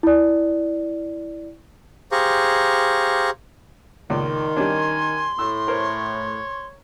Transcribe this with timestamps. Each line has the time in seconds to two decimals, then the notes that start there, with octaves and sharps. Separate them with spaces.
0.03 E4 D5
2.12 G4 G#4 C5 F5 A#5 C#6
4.10 C#2 A#2 D#3 C6
4.57 G3 C#4 D4 G#5
5.39 A2 E6
5.68 A#4 C5 C#5